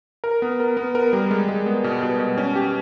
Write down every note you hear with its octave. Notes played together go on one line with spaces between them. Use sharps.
A#4
B3
A#4
B3
A#4
G3
G#3
G#3
B3
B2
B2
B2
C#4
G4